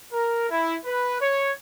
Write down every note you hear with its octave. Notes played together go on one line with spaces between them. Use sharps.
A#4
E4
B4
C#5